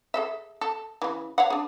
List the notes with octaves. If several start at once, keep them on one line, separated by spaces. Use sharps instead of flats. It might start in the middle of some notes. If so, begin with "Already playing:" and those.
G#4 A4 E5
A4
C#3 E3
C#5 F5 F#5
D4 G#4